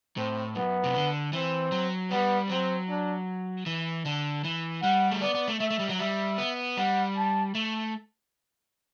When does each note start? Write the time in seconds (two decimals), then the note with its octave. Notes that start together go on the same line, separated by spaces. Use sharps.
0.17 A2 C4
0.55 F#2 B3
0.84 C3
0.95 D3
1.33 E3 C4
1.72 F#3
2.11 G3 B3
2.49 F#3 C4
2.89 D4
3.66 E3
4.05 D3
4.44 E3
4.82 G3 F#5
5.11 A3
5.21 B3 D5
5.35 B3
5.48 A3
5.60 A3 E5
5.70 A3
5.79 G3
5.89 F#3
5.99 G3 E5
6.38 B3
6.77 G3 F#5
7.16 A5
7.55 A3